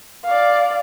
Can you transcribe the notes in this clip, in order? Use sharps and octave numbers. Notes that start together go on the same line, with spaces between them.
D5 F5